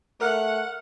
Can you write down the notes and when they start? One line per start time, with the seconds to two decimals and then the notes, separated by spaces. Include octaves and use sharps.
0.21 A3 A#4 F#5 F6